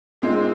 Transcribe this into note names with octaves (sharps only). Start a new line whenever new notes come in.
A#2 G#3 C4 D#4